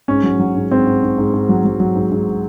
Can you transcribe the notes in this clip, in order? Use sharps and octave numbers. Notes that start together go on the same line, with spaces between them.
G#2 C#4
F#3
F#3
G#2
G#2 C4
G#2
G#2
G#2
G#2
F#3
F#3
F#3
G#2
G#2